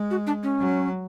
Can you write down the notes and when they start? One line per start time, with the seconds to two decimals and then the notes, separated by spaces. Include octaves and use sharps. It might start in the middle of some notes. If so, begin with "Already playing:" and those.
Already playing: G#3
0.11 F#4
0.27 D4
0.43 C#4
0.60 F#3